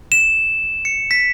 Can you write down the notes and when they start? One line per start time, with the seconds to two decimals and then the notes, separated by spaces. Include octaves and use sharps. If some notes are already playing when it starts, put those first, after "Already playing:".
0.12 E7
0.85 C#7
1.11 B6